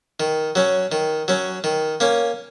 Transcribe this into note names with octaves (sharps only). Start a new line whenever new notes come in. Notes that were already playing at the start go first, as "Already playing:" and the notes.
D#3
F#3 C#4
D#3
F#3 C#4
D#3
A#3 C#4